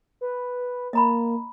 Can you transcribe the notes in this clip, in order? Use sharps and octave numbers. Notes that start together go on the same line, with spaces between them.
B4
A#3 D#5 A#5 B5